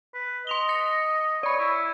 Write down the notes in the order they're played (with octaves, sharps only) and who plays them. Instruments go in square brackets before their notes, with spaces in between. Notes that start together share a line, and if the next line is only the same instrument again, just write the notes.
[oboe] B4
[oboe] D#5 [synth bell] C6 F7 G7
[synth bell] A#6 C#7
[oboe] C#5 [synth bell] D5 B5
[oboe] E4